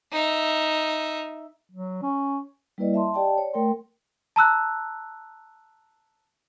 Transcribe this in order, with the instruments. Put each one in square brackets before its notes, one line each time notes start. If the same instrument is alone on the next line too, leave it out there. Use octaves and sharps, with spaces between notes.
[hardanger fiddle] D#4 E5
[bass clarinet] F#3
C#4
[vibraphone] G3 A#3 E4 B4 D5 D#5
E5 A5 C6
G4 D5 D#5 G5 A5
C#5 D5
A3 A#4 G5 C6
[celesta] A5 A#5 E6 F#6